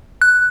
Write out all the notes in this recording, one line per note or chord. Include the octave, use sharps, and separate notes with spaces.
F#6